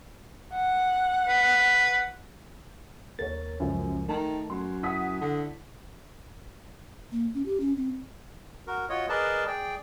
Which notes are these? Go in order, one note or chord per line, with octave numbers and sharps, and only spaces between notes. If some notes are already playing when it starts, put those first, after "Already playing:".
F#5
B4
D#2 A#4 C#5 A6
C#2 F#2 F3
D#3 A3 A5
F#2 C6
E4 F#5 D#6 B6
D3
A#3
C#4
G4
C#4
C4
F#4 A#4
F4 F#4 C#5 D#5
G#4 A#4 B4 D5 D#5 A5
G#4 D5 G5